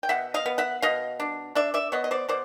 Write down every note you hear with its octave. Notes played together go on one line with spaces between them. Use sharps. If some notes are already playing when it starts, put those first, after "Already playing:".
G5
B2 E5 F#5
D#5 F5
B3
E5 F#5
B2 D#5 F5
D4
D4 D5 E5
D5 E5
B3 C#5 D#5
D#5
C5 D5
B2 C5 D5